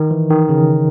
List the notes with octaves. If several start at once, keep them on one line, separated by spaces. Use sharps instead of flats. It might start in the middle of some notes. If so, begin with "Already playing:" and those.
Already playing: D#3
E3
D#3
C#3